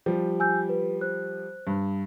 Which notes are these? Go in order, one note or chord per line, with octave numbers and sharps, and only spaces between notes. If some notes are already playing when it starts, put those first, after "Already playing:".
F3 G3 G4
G#5 E6 G6
B4
C5 F#6
G2